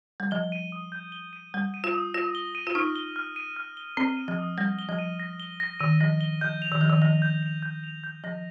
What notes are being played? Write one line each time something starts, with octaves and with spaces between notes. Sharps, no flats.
G3
F3 G7
D#7
D#6
G6
G7
D#7
G3 G7
D#7
F4
D#6
F4 A#6
G7
D#7
F4
D#4 F6
G7
F6
D#7
F6
G7
C4 G7
D#7
F3
D#6
G3 A#6
G7
F3
D#7
A#6
G7
A#6
D#3 D#7
F3 A#6
G7
F3 G6
F7
D#3
F3 G6
D#3
F3 A#6
G6
F7
G6
F7
G6
F3 A#6